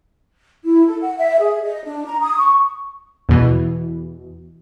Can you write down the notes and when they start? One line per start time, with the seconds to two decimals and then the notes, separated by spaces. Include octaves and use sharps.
0.63 E4
0.87 A4
1.01 F#5
1.17 E5
1.39 G#4
1.63 D#5
1.84 D4
2.06 A#5
2.22 D#6
2.37 C#6
3.29 E2 B2 E3